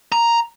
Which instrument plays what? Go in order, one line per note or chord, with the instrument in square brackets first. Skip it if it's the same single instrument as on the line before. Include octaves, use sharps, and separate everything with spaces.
[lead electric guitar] A#5